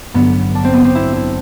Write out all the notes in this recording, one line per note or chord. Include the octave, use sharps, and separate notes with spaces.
A1 G2 D3 F#3 B3
D4
C4
B3
C4
E4
E4